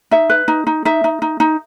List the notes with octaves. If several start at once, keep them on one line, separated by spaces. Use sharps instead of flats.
D#4 E5
B4
D#4
D#4
D#4 E5
D#4
D#4
D#4